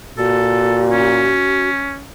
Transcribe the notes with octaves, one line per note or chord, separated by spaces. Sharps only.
A#2 F#4 A4
C#4